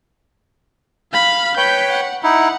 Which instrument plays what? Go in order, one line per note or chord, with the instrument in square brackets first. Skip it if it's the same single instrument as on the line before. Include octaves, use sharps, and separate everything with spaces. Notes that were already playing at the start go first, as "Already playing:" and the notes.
[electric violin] F5 B5
[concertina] B4 C#5 G5 [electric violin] G6 B6
[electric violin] F#5
[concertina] D#4 E4 [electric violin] F#5